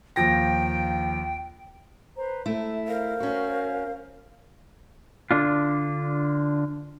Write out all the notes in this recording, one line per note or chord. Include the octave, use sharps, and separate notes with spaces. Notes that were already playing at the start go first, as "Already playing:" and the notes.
D#2 F3 G5 A#6
B4 C5 A#5
A3 E4 E5
A#4 C5 F5
C#4 F#4
D3 D4 F4